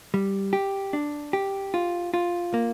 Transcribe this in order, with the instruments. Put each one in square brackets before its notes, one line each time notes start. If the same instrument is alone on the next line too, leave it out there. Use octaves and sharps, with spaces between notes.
[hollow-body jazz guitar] G3
G4
D4
G4
F4
F4
A#3